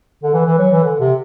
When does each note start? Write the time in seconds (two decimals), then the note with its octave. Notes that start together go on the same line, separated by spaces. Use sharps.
0.23 D3
0.34 E3
0.46 E3
0.59 F#3
0.71 E3
0.84 D3
1.00 C3